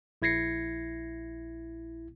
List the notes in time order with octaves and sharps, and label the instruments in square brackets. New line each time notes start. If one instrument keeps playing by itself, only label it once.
[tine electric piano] A#1 E4 G#6 A#6 C7 C#7